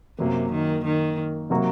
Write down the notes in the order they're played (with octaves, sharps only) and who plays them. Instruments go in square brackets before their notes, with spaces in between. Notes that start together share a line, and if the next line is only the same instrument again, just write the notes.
[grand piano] F#2 F#3 A#3 [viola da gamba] C3
[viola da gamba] D#3
D#3
[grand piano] C3 F#3 A#3 F#4